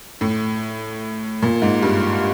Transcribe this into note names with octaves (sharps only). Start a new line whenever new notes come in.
A2
A#2
G#2
G2